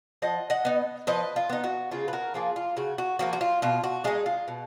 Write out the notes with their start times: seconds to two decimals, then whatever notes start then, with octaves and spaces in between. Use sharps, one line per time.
0.22 F3 D#5 F#5
0.50 D#5 F#5
0.65 B3 D#4
1.07 F3 B4 D#5
1.36 F4
1.50 B3 D#4
1.64 F#4
1.91 C#3 F4 G#4
2.08 B4
2.13 F#4 A#4
2.34 F3 A#3 F4 G#4
2.56 F4
2.77 C#3 F#4
2.98 F#4
3.19 F3 A#3 F#4
3.33 F#4
3.41 F4
3.62 B2 F4
3.84 F#4
4.04 G#3 F4 G#4
4.07 D#4
4.26 F4
4.48 B2